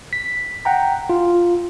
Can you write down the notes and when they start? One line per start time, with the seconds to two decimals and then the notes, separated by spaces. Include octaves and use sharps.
0.13 B6
0.65 F#5 G5 A#5
1.10 F4